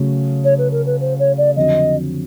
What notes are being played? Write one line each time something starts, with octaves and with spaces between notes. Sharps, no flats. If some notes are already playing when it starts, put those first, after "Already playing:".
Already playing: C#3 F#3 A3
C#5
B4
A#4
B4
C5
C#5
D5
F2 D3 F#3 D#5